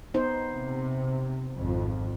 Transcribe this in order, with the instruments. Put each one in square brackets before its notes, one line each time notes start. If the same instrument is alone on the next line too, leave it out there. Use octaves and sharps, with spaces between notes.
[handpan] B3 D#4 C5
[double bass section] C3
G#1 F2